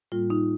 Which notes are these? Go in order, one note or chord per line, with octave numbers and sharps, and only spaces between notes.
A2 G3 A#3 F4
D#4